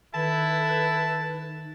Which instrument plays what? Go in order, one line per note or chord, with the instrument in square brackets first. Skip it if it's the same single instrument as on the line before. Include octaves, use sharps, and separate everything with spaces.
[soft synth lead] D#3 [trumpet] E4 [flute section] A4 B4 [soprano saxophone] A5